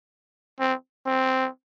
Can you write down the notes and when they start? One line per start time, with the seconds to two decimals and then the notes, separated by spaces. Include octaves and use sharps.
0.59 C4
1.06 C4